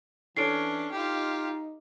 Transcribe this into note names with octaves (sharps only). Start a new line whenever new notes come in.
E3 C#4 D4 E4 A4 C#5 C7 D7
D#4 F4 G4